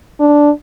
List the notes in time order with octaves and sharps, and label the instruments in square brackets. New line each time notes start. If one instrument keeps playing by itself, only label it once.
[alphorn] D4